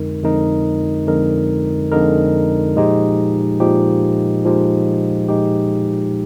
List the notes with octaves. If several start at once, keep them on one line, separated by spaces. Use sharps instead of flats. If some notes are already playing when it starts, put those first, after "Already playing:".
Already playing: F2 D3 G#3 D#4 A#4
F2 D3 G#3 D#4 A#4
F2 D3 G#3 D#4 A#4
F2 D3 G#3 D#4 A#4
A#2 F3 G#3 D#4 G4
A#2 F3 G#3 D#4 G4
A#2 F3 G#3 D#4 G4
A#2 F3 G#3 D#4 G4